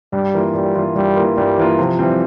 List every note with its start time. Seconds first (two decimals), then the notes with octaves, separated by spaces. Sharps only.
0.13 G2 G3
0.34 E3 A#3 F4
0.54 G2 G3
0.74 E3 A#3 F4
0.95 G2 G3
1.16 E3 A#3 F4
1.37 G2 G3
1.58 E3 A#3 F4
1.79 C3 F3
1.99 E3 G3 C4